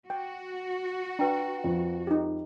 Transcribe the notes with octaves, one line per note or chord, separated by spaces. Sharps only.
F#4 G5
D4 B4 G5 A#5
F2
D#4 G4